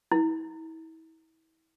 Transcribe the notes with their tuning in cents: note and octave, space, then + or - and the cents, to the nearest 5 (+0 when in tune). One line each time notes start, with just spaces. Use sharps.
E4 -35